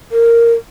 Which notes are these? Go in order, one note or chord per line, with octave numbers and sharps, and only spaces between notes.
A#4